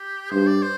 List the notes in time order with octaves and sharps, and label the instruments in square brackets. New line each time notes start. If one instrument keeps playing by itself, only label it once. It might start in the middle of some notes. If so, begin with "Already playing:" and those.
Already playing: [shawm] G4
[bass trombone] G2 [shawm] C5
[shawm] D5
C5